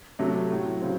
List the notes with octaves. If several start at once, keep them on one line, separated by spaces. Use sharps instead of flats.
C3 F#3 A3
A2 F#3
C#3 F#3 C4